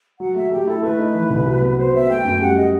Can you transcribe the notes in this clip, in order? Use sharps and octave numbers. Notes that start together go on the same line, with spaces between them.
F#3 F#5
A3 E5
A3 G4
E4 A4
A3 B4
D#4
E3
C2
F#3
B3
F#3 C5
B3 E5
A3 G5
F#2
G3 F#5
D#5